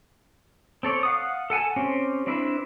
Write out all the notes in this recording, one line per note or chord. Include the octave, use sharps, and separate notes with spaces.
C4 A4 C#5 D5
F5 F#5 D#6
A4 F#5 G#5 A5
C4 C#4 G4
C4 D4 E4 B4 E5